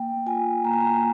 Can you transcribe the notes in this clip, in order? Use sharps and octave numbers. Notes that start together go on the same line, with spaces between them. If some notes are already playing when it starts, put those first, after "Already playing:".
Already playing: A#3 G5
F4 G#5
A#3 A#5
G#5
A#5